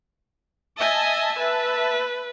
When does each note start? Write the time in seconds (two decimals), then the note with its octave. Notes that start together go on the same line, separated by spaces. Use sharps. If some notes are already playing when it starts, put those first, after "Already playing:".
0.77 D#5 E5 G#5 A5
1.38 B4